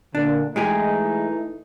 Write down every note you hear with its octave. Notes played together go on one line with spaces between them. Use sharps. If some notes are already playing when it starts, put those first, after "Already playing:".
A#2 D3 D4
E3 G#3 A3 D#4 G4 G#4